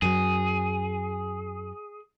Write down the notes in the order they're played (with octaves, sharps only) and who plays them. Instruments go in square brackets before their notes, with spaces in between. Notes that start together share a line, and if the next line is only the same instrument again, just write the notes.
[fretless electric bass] F#2 F#3 [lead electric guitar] G#4